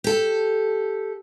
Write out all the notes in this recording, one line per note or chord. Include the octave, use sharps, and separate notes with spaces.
G4 A4